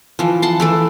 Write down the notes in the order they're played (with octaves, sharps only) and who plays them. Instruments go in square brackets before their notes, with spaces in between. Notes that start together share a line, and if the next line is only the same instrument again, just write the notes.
[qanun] E3 F3
F#5 A5 C6
E3 A3 A4